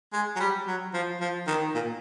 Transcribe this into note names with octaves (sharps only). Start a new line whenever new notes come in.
G#3
F#3
G3
F#3
F3
F3
D#3
A#2